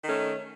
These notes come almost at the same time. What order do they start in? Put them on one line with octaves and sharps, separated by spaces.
D#3 C#4 A3